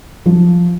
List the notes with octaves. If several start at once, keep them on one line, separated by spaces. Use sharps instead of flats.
F3